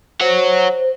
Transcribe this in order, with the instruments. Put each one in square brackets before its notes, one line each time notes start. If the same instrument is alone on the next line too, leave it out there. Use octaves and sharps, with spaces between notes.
[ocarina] C5 [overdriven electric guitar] C#5 F#5